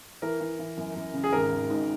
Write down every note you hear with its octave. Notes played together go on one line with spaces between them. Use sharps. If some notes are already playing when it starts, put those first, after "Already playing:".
E3 A#4
E3
E3
F#2
F#2
C#3
G#4
G#1 A#4
G#1
G#2